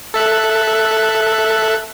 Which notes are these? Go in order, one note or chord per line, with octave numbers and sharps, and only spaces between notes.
A4 E5 F#6